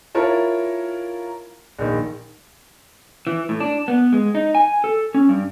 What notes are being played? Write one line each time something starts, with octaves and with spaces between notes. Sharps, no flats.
E4 F4 A#4 C#5 A5
A#1 D#3
E3
A2
D4
B3
G#3
D#4
G#5
A4
C#4
G2